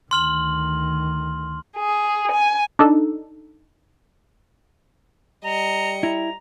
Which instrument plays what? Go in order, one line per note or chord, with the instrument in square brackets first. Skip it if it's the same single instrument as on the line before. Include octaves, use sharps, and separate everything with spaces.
[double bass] D2 D#3 [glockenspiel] C6 F6 F#7
[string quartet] G#4
G#5
[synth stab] D4 D#4 A4
[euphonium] G3 [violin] D#5 C#7 [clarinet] A#5
[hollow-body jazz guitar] E4 [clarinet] A#5